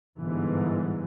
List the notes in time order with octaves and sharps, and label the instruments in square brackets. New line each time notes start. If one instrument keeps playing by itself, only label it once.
[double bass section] G1 G#2 E3